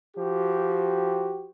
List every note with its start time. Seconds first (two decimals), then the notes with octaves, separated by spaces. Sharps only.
0.16 F3 F#4 G4